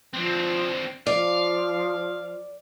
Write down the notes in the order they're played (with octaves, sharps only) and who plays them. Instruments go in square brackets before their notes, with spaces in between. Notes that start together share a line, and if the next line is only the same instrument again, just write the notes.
[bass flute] F3 [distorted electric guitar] C4 D4
[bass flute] F3 [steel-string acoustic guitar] D5 [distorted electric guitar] F5